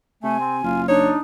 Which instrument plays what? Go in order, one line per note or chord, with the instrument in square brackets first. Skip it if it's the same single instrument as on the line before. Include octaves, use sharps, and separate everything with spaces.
[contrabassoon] C3 [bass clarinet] A3 [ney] G#5
[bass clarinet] C4
[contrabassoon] F#1 [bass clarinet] F4
[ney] D4 [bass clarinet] D#4 [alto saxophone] C#5